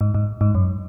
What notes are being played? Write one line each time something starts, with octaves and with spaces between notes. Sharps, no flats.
G#2
G#2
G#2
F#2